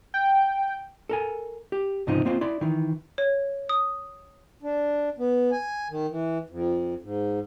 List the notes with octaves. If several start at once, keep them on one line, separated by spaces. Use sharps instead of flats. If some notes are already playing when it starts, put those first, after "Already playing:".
G5
A4 A#4 G#5
G4
C#2 G#2 C3 F3 D#4 D#5
A#3 C4 F4 C5 D#5 F5
E4 D5 C6
D#3 E3
C#5
D#6
D4
B3
G#5
D#3
E3
F2
G#2